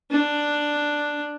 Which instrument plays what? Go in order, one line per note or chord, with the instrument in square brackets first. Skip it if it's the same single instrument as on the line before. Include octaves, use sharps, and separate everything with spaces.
[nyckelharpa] D4